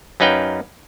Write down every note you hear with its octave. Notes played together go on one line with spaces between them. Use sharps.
F#2 C#4 D#4 B4 F5 G5